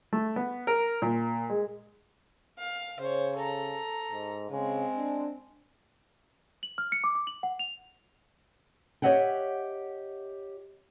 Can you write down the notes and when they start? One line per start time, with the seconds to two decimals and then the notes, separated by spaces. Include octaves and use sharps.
0.13 A3
0.36 B3
0.67 A#4
1.02 A#2
1.50 G#3
2.59 F5
3.00 C#3 C5 C#5
3.37 A4 A#5
4.12 G#2
4.50 C#3 G#3 C4
4.97 D4
6.63 F#7
6.78 F6
6.92 C#7
7.04 D6
7.15 D6
7.27 F#7
7.43 F#5
7.59 F7
9.02 G4 C#5 D#5 E5 F#5 G5